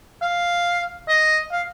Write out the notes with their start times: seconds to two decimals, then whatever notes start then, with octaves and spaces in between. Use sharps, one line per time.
0.22 F5
1.08 D#5
1.52 F5